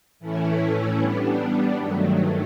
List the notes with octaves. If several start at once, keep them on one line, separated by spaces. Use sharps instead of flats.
A2 E3 A3 C#4 E4
G3 B3 D4
G2 D#3 F#3 A3